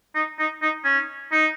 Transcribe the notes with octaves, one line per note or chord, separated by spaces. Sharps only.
D#4
D#4
D#4
C#4
D#4